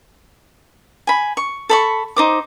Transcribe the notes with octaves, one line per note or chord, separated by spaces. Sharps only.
G#5 B5
C#6
A4 B5 C#6
D#4 C5 D6